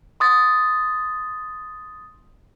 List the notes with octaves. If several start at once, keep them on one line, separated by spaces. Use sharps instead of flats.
C6 D#6 A6